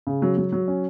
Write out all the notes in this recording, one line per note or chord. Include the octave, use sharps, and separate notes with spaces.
C#3
F#3
F#3
F#3
C#4